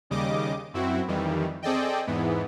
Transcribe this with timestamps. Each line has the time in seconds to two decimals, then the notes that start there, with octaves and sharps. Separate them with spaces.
0.10 D#2 C#3 G3 D#5 D6
0.74 F#2 C4 E4 F#4
1.08 F2 D#3 E3 G3
1.62 C4 G#4 A4 D5 D#5 G5
2.07 E2 G#2 E3 B3